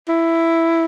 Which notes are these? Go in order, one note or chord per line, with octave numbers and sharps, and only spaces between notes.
E4